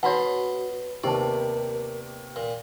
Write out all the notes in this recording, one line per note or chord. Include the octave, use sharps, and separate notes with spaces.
B2 F#4 G#4 C#5 F#5 A5 B5 C6
D#2 C3 B3 G4 A#4 C5 D5 A5
A#2